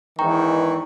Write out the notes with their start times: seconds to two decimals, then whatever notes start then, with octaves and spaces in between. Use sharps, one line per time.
0.19 E2 G#2 D#3 E3 G5 A#5 C#6